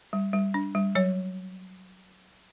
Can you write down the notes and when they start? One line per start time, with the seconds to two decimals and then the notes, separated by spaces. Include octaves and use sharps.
0.13 G3
0.34 G3
0.54 D4
0.75 G3
0.95 F#3 C#5